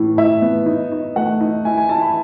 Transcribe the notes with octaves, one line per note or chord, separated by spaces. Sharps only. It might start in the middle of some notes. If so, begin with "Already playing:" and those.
Already playing: A2 E3
A2 E5
B3
D#4
D#4
A3 F#5
D#4
E4 G#5
G#5
E4 A5
B5